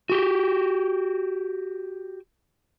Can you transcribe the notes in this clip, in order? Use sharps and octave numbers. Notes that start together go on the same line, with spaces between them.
F#4 G4